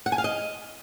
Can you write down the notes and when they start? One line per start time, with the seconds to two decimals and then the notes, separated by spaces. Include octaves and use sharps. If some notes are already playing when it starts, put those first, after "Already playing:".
0.06 F#5
0.12 G#5
0.18 F5
0.24 D#5